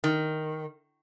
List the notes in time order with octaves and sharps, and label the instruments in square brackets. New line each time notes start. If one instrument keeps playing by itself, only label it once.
[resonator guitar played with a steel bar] D#3